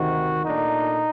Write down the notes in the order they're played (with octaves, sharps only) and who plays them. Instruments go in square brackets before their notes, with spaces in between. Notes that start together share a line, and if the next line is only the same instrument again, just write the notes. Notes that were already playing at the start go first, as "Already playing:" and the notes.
Already playing: [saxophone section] D2 C3 D#3 [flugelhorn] F#4
[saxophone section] A#2 A3 D4 [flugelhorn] D#4